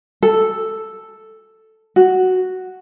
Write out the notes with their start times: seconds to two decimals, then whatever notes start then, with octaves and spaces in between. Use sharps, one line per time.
0.23 A4
1.96 F#4